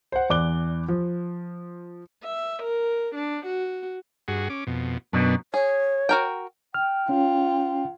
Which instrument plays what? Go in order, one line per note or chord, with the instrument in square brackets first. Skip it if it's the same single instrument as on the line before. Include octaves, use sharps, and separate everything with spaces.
[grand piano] C5 F#5
E2 D5 D6 F#6 G7
F3
[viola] E5
A#4
D4
F#4
[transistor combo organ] G2 F#4 G#4
C#4 D6
F2 B2
[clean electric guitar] F#2 B2 [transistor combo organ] B3 D4
[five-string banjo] G#4 [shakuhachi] C#5
[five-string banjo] F#4 A#4 G5
[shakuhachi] G5 [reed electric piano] F6
[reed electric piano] C#4 [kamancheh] F4